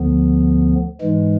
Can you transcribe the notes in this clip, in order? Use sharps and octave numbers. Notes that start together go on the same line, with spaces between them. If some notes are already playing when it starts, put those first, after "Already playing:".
Already playing: D2 D3 F3 B3
G#2 E3 G#3